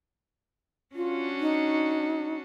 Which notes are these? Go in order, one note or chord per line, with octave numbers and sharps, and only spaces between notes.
C#4 D4 F4 F#4
D#4